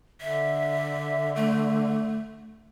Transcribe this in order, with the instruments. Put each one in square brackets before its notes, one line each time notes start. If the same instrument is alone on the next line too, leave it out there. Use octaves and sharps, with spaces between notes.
[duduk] D3 [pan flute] E5
[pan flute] A3